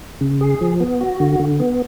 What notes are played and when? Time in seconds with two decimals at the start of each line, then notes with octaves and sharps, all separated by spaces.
0.21 C#3
0.41 G#4
0.61 F3
0.80 B3
1.01 F#4
1.20 D3
1.40 D3
1.60 B3